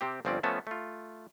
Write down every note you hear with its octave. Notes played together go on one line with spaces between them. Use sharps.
C3 C4 G4
G1 F3 C4 C#4 D5
F3 A3 B3 C#4 A5
A3 F4